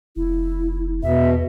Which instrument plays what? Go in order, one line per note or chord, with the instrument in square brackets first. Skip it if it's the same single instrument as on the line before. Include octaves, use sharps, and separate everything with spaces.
[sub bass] F1 [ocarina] E4
[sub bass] E2 [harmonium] B2 [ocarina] E5